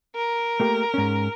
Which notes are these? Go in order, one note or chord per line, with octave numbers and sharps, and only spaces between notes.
A#4
A3 A#3 G4
G#2 C#4